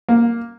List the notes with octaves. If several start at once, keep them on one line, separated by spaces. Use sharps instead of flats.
A#3